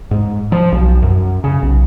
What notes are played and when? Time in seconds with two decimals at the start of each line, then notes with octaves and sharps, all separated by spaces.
0.11 G#2
0.52 F3
0.72 B1
1.02 F#2
1.44 C#3
1.62 B1